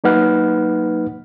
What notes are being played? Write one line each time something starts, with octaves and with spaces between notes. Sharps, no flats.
F#3 A#3 D#4 B4 F#5 F6